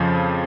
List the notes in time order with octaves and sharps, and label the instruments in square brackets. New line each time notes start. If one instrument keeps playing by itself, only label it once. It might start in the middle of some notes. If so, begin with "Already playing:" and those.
Already playing: [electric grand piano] F2 C#3 F3